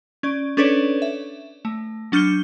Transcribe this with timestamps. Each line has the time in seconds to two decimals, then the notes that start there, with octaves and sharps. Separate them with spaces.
0.23 C#4 D5
0.57 C#4 D4 A4 B4 C#5 D5
1.02 E5
1.65 A3
2.12 F#3 D4 F6 G6 C#7 G7